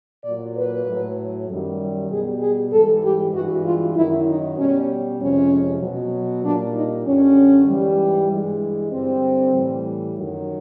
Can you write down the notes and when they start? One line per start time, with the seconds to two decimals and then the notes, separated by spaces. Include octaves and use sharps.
0.24 A#2 F#3 D5
0.56 B4
0.86 A2 F#3
1.48 F#2 D#3 G3
2.11 B2 G3 G#4
2.41 G#4
2.71 G#2 E3 G3 A4
3.03 G4
3.34 G2 E3 G#3 F#4
3.65 F4
3.96 F#2 D#3 F#3 E4
4.27 D#4
4.58 B2 G3 C#4
5.20 F2 C3 F3 G#3 C#4
5.81 B2 F#3
6.43 A#2 G3 D4
6.74 D#4
7.05 F#2 D3 G3 C#4
7.67 G#2 E3 G3
8.29 G2 E3 G#3
8.91 G2 D3 G3 C4
9.52 A2 E3 G3
10.15 F#2 D#3 F#3